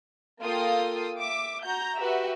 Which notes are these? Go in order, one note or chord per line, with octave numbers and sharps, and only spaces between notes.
A#3 F4 A4 F5 G5 D#6
E5 D6
F#4 A#5 G6
F#4 G4 B4 E5